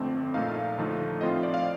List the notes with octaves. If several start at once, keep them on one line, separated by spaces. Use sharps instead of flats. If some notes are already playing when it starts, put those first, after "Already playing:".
Already playing: G1 F2 D3 A3 C4
A#1 A#2 A3 D#4 F5
D#2 D3 F3 A3 D#4
A2 F3 C4 F4 D#5
D5
F5